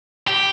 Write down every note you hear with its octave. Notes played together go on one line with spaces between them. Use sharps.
G4